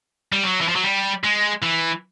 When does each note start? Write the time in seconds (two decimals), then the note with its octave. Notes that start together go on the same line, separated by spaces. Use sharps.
0.32 G3
0.44 F#3
0.61 E3
0.69 F3
0.76 F#3
0.84 G3
1.24 G#3
1.63 E3